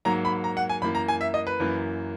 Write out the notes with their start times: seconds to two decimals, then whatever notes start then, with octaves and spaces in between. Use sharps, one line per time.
0.05 G#2 F#3 A#3 A#5
0.25 B5
0.44 A#5
0.57 F#5
0.69 G#5
0.82 F#2 E3 A#3 B5
0.95 A#5
1.08 G#5
1.21 E5
1.34 D#5
1.47 B4
1.60 F#2 E3 A#3